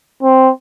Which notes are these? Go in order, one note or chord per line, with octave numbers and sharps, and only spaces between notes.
C4